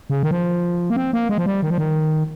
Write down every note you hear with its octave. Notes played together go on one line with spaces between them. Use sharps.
C#3
D#3
F3
A#3
C4
A#3
G#3
F3
G3
D#3
F3
D#3